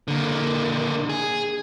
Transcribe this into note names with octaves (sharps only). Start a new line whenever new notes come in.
D3 A#3
G#4